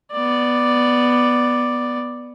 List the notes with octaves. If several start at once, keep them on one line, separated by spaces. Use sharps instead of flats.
B3 D5